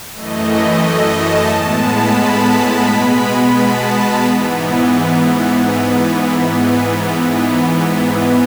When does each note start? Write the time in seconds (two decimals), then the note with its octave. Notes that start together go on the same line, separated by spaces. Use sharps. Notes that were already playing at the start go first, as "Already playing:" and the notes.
0.13 F#2 E3 A3 D#5
0.82 D#5
1.16 A5
1.50 A2 G#3 B3 A5
1.85 B5
2.19 A5
2.53 B5
2.87 B2 G#3 B3
3.56 A5
4.25 G#2 E3 B3